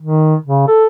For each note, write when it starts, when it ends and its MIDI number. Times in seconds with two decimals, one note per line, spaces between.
0.01 0.35 51
0.46 0.67 49
0.68 0.86 69